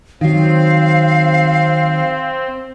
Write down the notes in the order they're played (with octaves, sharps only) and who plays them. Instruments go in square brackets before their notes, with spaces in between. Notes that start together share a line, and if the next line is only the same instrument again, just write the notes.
[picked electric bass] D#3 F#3 [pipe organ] C4 [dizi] F5